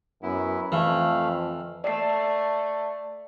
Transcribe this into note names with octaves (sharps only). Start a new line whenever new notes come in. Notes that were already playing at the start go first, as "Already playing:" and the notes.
F#2 B3 E4
F2 E3 A3 F5
A3 D5 C7